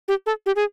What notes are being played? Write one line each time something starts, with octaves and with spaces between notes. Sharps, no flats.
G4
A4
G4
G#4